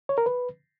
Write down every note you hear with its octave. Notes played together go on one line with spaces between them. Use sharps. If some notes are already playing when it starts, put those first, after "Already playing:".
C#5
A#4
B4